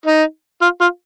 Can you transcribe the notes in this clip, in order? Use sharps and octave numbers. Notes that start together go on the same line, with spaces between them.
D#4
F4
F4